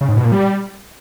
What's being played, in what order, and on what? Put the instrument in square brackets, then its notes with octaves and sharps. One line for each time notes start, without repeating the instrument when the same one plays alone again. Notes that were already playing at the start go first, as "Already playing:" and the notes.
[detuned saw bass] C#3
G#2
B2
A#2
G3